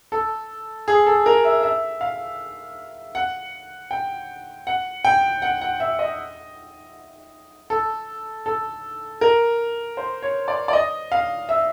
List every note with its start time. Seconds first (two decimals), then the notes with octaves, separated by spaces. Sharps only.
0.12 A4
0.88 G#4
1.07 A4
1.26 A#4
1.45 E5
1.63 E5
2.01 F5
3.15 F#5
3.91 G5
4.67 F#5
5.05 G5
5.42 F#5
5.61 F#5
5.80 E5
5.99 D#5
7.70 A4
8.46 A4
9.21 A#4
9.97 C5
10.22 C#5
10.48 D5
10.68 D5
10.73 D#5
11.12 F5
11.49 E5